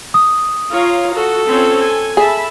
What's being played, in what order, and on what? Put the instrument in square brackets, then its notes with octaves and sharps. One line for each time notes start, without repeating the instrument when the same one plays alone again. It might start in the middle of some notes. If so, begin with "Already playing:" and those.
[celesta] D#6
[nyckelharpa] F4 [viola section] C#5 F5 A#5
[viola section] F#4 [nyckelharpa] A4
[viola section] C4 C#4 F4
G#5
[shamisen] G#4 [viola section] E5 A5 B5